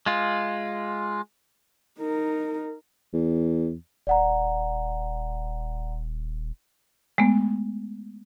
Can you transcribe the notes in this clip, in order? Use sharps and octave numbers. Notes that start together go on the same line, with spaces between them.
G#3 F4
D#4 A#4
E2
D#1 D5 F#5 A#5
G#3 A3 B3